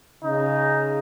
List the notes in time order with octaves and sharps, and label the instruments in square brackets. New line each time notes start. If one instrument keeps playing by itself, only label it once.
[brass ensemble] C#3 [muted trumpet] D#4